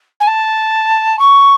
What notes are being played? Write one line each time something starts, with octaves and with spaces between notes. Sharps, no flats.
G#5
A5
C#6